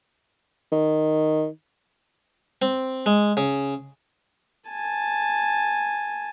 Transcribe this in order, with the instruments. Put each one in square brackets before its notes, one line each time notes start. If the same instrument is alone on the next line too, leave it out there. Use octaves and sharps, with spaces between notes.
[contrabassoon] D#3
[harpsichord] C4
G#3
C#3
[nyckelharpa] G#5 A5